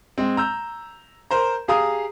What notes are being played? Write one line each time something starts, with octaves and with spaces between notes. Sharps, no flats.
G#3 C4
A#5 E6 G6
A#4 C5 A#5
G4 G#4 F5 A#5 D#6